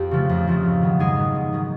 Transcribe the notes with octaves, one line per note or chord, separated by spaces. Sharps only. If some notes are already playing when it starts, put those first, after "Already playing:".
Already playing: F2 G4
C#3 F3 A3
F2
C#3 F3 A3
G#2
D#3 F#3 B3
G#2 G#3 G#4
D#3 F#3 B3
G#2
D#3 F#3 B3